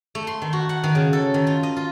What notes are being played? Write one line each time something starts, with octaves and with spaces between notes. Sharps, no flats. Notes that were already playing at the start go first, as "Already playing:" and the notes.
A3
C6
D#3
F#4
F#5
D#3
C#3
A4
D#3
F4
D#5
F4